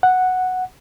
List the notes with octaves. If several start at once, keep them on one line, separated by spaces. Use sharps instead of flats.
F#5